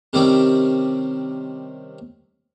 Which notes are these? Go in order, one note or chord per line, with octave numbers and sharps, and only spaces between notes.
C3 D#3 G3 C4 C#4 G4